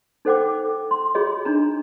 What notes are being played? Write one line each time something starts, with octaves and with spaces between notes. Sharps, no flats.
D#4 A4 C5 F#5 G5 D6
C6
F4 F#4 G#4 C#5 D#5
D4 D#4 A#5